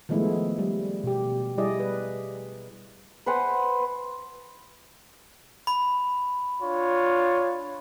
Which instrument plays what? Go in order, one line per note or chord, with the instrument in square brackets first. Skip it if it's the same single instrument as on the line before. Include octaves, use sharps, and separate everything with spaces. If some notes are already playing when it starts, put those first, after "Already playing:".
[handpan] D#3 F3 G#3 A3 B3 E4
G3
B2 G4
G3 E4 G#4 D5 D#5
B4
[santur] B4 C5 F#5 G#5
[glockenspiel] B5
[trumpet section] D4 F4 C#5